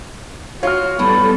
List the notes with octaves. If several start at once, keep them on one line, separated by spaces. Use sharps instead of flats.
F4 F#4 C#5 F6
A2 G3 B3 A4